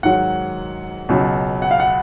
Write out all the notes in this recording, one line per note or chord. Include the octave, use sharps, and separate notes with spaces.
G#2 D#3 F#3 F#5
C#2 B2 F#3
F#5
F5
F#5